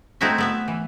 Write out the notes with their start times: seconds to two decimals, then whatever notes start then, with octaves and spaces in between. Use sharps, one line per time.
0.21 A3 C4 D#4 E4 F#4 E5
0.38 A3 B3 E5
0.68 E3